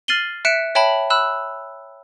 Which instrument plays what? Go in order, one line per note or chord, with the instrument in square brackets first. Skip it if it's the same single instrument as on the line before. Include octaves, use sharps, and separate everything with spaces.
[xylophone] F6 A6 C7 D#7 F#7 G7
E5 F#6 B6 C#7 D7 E7
C#5 E5 G5 A5 B5 F#7
B5 E6 F#6 E7